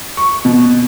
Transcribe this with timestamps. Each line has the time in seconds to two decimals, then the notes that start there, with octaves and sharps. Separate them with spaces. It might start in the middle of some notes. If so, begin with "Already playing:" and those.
0.17 C#6
0.45 B2